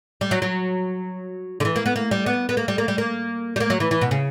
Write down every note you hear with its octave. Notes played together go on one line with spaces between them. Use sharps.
G3
F#3
F#3
D3
E3
A#3
B3
A#3
G3
B3
B3
A#3
G3
A#3
G3
A#3
G3
A#3
F#3
E3
E3
B2
C#3